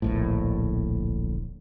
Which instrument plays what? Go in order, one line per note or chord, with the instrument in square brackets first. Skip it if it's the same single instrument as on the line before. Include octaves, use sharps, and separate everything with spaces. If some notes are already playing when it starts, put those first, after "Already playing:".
[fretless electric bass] D1 A#1 A2